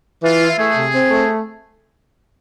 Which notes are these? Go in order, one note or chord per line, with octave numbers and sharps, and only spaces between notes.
E3 F4
E4
A3 G#4
C3
C4
A3